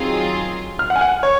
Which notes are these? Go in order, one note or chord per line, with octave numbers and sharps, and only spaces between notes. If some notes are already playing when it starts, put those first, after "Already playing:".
Already playing: D#3 F#3 C4 F4 G#4
F6
F#5
G#5
F#5
C#5